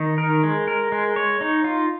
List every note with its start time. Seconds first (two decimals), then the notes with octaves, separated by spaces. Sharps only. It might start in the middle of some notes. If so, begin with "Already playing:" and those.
Already playing: D#3 D#4
0.18 A#4
0.43 G#3
0.68 A#4
0.92 G#3
1.16 C#5
1.41 D#4
1.64 F4